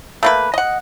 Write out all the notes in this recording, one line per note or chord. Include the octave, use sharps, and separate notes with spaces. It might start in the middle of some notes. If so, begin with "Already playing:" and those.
A3 A#3 B4
D#5 F#5